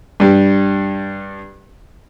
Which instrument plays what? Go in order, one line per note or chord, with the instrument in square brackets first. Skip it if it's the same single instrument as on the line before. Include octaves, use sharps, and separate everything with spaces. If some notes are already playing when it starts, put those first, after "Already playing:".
[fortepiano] G2 G3